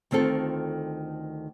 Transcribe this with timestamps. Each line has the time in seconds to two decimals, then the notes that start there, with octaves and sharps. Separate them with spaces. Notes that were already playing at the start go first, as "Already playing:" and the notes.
0.11 D2 D#3 C4 F4 A4